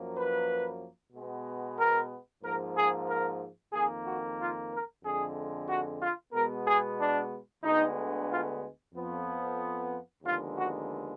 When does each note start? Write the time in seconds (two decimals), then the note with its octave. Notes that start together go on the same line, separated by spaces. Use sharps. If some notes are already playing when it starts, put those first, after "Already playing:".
Already playing: F#2 F3 A#3
0.16 B4
1.13 B2 G#3 B3
1.78 A#4
2.43 G#2 F3 A#3 A#4
2.75 G#4
3.08 A#4
3.73 F2 D#3 A#3 G#4
4.05 F#4
4.38 F4
4.70 A#4
5.03 F2 D3 G#3 G#4
5.68 F#4
6.00 F4
6.32 B2 G#3 B3 A#4
6.66 G#4
6.98 D4
7.62 D2 D3 G#3 B3 D#4
8.29 F4
8.93 F2 F3 B3
10.23 D#2 D3 F3 G#3 B3 F4
10.56 F#4